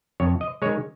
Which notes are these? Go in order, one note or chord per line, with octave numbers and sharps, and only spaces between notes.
F2 C#5
D#5
D#3 G#3 C#5